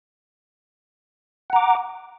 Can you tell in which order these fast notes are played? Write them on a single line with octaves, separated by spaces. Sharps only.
F#5 A#5 D6